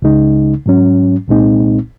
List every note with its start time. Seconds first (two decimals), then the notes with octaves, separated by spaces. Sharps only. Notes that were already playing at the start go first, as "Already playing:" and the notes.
0.02 C#2 C#3 G#3 D#4
0.66 G#2 F#3 C#4
1.28 C2 A#2 G#3 C4 D#4